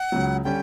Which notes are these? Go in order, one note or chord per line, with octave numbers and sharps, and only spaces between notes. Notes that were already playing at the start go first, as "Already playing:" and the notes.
Already playing: F#5
C#2 C#3 F#3
D3 G3 C#4 G5